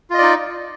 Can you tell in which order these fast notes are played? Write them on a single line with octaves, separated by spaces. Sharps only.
F4 D#5 D5 D#4